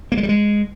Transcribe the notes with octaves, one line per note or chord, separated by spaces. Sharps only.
A#3
G#3
G3
G#3